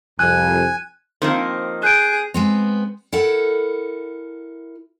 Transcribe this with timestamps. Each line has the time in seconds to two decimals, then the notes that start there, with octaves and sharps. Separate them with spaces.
0.19 C2 F2 G#5 F#6
1.22 D#3 F3 A#3 C4 A#4
1.83 G#4 F#6 G6 D7
2.34 G#3 B3 C4
3.12 E4 A4 A#4 F#5